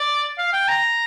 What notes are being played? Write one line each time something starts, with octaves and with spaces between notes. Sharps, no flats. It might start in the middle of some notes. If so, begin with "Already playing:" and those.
Already playing: D5
F5
G5
A#5